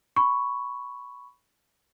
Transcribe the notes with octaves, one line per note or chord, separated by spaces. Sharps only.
B5 C#6